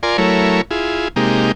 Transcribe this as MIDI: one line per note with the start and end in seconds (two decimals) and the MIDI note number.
0.03 0.17 65
0.03 0.17 70
0.03 0.17 74
0.03 0.17 80
0.03 0.17 84
0.18 0.61 54
0.18 0.61 57
0.18 0.61 64
0.18 0.61 70
0.18 0.61 73
0.71 1.08 64
0.71 1.08 65
0.71 1.08 68
1.16 1.52 48
1.16 1.52 56
1.16 1.52 58
1.16 1.52 63
1.16 1.52 67